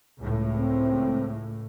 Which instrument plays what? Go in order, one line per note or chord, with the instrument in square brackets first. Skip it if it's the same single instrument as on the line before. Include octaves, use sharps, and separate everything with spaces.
[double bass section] C#2 A2
[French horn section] C4